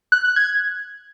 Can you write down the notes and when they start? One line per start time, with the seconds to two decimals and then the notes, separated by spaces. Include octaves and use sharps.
0.12 F#6
0.24 F#6
0.36 G#6